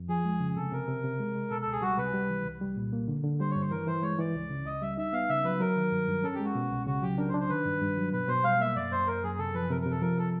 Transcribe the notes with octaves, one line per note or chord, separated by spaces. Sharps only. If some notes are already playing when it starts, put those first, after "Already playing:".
Already playing: F2
F3 G#4
G#3
C#3
C3 A4
C3 A#4
C3
C3
G#3
G#3
B2 A4
C#2 A4
G#4
G3 F#4
C3 B4
G3
E3
C2
G3
A#2
A#3
D3
D3
G3 C5
C#5
G2
C5
E3 A#4
E3 C5
G#3 C#5
E3 D5
C#2
C#3
C#2 D#5
G3 E5
D#4 E5
B3 F5
C#3 E5
F#3 B4
F#3 A#4
D#3
G2
G2
C#4 A4
G4
G#3 F#4
B2
C2
C#3 F#4
F#3 G4
D4 A#4
C5
D4
C5
D#3 B4
G2
G2
F#3
B2 B4
B2 C5
G3 F5
A#3 E5
F#2 D5
F#2 C5
F#2 A#4
F#2 G#4
C3 A4
F3 B4
C3 A#4
C3 A#4
A4
F3 A#4
A4